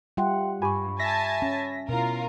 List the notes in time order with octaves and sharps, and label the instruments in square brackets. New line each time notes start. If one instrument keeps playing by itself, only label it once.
[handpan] G3 F4 F#5 [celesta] E5 G5 C6
[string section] G2 [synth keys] G4 G#5 [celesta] B5 C#6
[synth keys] E5 A#6 B6 [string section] G#5 A5
[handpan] C#4
[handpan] B2 E4 [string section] F4 A#4